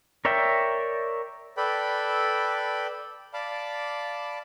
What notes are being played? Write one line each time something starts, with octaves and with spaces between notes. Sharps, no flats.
A#4 C#5 D5 E5 G5
A4 B4 D5 G5 B5
D5 F5 A5 B5 D6